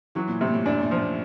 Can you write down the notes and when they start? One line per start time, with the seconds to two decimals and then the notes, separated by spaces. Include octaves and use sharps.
0.15 E3 F#3
0.28 A#2
0.41 A2 C3
0.47 A#2
0.54 A2
0.66 F#2 D4
0.82 A#2
0.91 F3
0.99 A#2